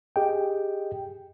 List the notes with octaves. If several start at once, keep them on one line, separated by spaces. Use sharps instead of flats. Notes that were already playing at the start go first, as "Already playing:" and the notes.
G4 G#4 D#5 G5